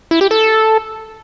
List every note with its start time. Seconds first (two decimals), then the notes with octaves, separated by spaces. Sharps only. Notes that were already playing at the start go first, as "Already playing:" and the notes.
0.11 E4
0.21 G4
0.31 A4